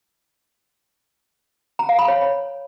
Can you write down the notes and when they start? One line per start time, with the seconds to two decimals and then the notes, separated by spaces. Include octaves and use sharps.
1.79 A#5
1.89 F5
1.99 B5
2.08 C#5